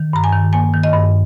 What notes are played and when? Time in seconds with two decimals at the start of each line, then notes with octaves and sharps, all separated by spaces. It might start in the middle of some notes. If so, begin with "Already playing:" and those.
Already playing: D#3
0.13 G2 A#5
0.24 G#5
0.33 D#3
0.53 A#3 G#5
0.74 D#3
0.84 D#5
0.93 G2